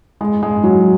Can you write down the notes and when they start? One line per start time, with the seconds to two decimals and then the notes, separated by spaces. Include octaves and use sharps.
0.21 G#3
0.42 G#3
0.64 F#3